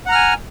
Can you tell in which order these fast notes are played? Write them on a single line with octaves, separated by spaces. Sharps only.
F#5 A#5 F6 G#5